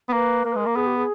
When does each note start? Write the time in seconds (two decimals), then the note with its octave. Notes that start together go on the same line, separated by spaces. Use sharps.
0.08 B3
0.12 A#3 B4
0.44 A#3 A#4
0.52 B4
0.55 G#3 A#4
0.66 A#3
0.76 B3 G#4
0.86 G4
0.96 G#4